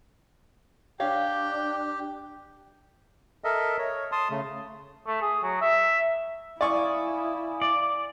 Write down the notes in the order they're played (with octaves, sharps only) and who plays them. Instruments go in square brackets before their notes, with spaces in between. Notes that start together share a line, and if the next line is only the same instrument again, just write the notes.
[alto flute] D4 [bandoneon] G4 [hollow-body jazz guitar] C#5 F5 [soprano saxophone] G5
[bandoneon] A4 A#4 D#5 E5
C#5
A5 C6 D#6
C#3 A3
[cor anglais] A3
G#4
F#3
E5
[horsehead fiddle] E4 [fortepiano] D5 C#6 [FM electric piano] F5 G#5 D#6
[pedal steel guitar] D5